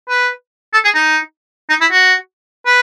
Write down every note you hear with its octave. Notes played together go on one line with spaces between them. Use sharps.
B4
A4
G#4
D#4
D#4
E4
F#4
B4